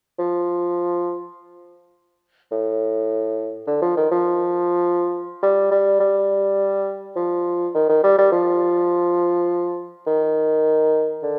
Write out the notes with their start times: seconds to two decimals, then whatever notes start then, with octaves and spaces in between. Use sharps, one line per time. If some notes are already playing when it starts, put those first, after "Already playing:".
0.19 F3
2.52 A2
3.67 D3
3.82 F3
3.97 D#3
4.11 F3
5.43 G3
5.71 G3
6.00 G3
7.16 F3
7.74 D#3
7.89 D#3
8.04 G3
8.18 G3
8.32 F3
10.07 D#3
11.23 D3